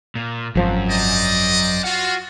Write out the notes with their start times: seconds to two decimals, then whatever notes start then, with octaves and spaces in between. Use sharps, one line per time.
0.15 A#2
0.55 G#1 F#2 F3
0.90 C5 D5 D#5
1.84 F4 F#4 F#5